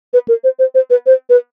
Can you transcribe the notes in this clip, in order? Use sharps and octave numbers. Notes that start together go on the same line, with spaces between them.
B4
A#4
C5
C5
C5
B4
C5
B4